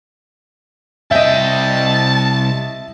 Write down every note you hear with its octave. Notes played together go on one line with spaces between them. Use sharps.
C2 D#5 E5 G5 A5